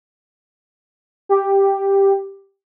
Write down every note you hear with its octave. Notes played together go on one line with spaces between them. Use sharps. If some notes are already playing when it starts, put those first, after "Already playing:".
G4